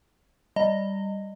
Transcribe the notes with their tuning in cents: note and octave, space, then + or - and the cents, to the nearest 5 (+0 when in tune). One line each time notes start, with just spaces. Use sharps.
G3 +0 D#5 +0 A#5 -40